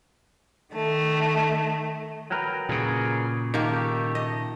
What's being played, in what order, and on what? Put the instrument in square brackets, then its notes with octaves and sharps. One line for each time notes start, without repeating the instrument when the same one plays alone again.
[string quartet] D#3 A3
[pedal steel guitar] F#3 A#4 B4 [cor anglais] G5
[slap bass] A#2 C#3 [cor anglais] G#4
[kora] D#3 A#3 [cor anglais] A3 [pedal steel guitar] G4
[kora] D#5